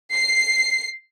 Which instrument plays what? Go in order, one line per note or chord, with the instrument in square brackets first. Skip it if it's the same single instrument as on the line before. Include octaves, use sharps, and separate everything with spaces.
[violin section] C7